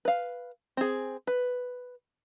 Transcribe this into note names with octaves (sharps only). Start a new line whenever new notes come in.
B4 F5
C4 G#4
B4